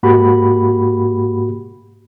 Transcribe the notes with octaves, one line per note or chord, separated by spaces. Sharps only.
G#2 A#3 F#4 G4 B5